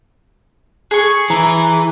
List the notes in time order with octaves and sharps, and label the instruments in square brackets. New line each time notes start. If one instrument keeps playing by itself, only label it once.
[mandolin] G#4 C#6
[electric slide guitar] E3 [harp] A#5